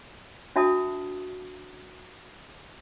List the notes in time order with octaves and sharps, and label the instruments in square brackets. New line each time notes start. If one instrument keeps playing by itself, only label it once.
[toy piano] D4 F#4 E5 A5 D#6